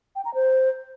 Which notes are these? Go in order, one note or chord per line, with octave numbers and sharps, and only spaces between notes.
G5
A#5
C5